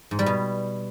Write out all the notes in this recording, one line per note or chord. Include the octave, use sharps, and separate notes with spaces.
G#2
G3
B2